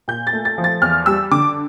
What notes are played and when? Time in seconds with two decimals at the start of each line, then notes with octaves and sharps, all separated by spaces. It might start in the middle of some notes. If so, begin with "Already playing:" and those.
0.08 A#2 G6
0.27 A6
0.33 A3
0.45 A6
0.58 F3
0.64 A6
0.82 E2 F6
1.06 G3 E6
1.31 D3 D6